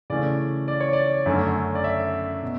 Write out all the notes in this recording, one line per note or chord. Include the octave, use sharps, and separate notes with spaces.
C#3 E3 A3 C#4 D5
D5
C#5
D5
F#2 D3 A3 C#4
D5
E5
B2